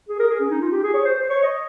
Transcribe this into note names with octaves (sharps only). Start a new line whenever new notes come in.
G#4
A#4
G#4
C#4
D#4
F4
G4
G#4
C#5
C5
C5
C#5
D#5